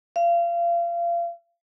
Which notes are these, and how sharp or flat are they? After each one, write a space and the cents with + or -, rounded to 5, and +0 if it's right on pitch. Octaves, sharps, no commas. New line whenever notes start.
F5 -30